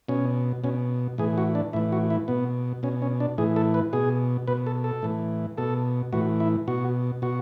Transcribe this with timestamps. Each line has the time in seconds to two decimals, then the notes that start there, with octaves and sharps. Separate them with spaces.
0.08 B2 C#4
0.64 B2 C#4
1.18 A2 E3 G#4
1.38 F#4
1.55 D4
1.73 A2 E3 E4
1.92 F#4
2.10 E4
2.28 B2 B3
2.83 B2 C#4
3.02 C#4
3.20 D4
3.38 A2 E3 G#4
3.56 A4
3.74 B4
3.93 B2 G#4
4.47 B2 B4
4.67 A4
4.84 A4
5.02 A2 E3
5.57 B2 A4
6.13 A2 E3 F#4
6.40 E4
6.67 B2 F#4
7.22 B2 F#4